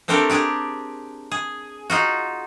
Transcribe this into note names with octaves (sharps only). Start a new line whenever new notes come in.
A3 C4 D4 G4 A4 A#4
D4 G4 G#4
G#4
D#4 F4 F#4